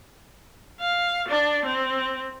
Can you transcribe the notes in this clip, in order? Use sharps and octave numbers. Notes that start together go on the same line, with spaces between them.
F5
D4
C4